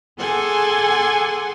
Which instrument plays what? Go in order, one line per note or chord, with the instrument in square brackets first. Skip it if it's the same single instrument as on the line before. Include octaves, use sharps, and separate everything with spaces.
[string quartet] G#4 A4 F#5 G#5 C6 D6